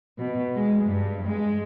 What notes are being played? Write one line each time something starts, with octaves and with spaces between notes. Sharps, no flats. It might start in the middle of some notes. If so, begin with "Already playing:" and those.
B2
G#3
G2
G#3